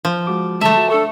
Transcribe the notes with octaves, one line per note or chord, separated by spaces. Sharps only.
F3
G#3 F#4 D6
D3 F#3 G#3 A3 E5 A5
F#4
D4 A4 A5 C#6